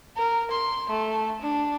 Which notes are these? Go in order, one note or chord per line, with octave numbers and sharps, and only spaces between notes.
A#4
C6
A3
D4